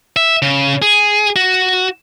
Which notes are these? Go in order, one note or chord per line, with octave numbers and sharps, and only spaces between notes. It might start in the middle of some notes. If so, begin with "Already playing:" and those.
E5
C#3
G#4
F#4